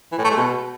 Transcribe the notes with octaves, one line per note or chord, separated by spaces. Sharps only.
E3
A2
A3
G#3
B2